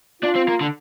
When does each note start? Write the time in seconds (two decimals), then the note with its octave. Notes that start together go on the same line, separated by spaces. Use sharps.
0.22 D4 F4
0.35 C4
0.48 A#3
0.61 D3